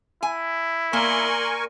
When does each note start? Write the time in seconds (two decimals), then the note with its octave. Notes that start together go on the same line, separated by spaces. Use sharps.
0.23 E4 G#5
0.93 A#3 A#4 D5 G#5 C6 C#6